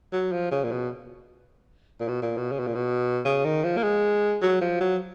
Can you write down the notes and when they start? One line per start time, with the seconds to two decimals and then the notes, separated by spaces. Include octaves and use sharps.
0.13 F#3
0.32 F3
0.51 C#3
0.64 A#2
0.72 B2
2.00 A#2
2.08 B2
2.23 A#2
2.37 B2
2.52 C#3
2.59 B2
2.67 A#2
2.75 B2
3.25 C#3
3.45 D#3
3.64 F3
3.77 A#3
3.83 G#3
4.42 F#3
4.61 F3
4.81 F#3